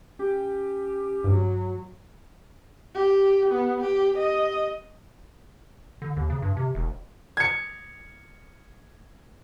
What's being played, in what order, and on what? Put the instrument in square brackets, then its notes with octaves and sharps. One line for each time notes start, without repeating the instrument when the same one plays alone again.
[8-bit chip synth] C#4 [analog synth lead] G4
[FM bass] G2 [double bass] F#3
[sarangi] G4
B3
G4
D#5
[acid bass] D3
D#2
C#3
G2
C3
E1
[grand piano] G#6 C#7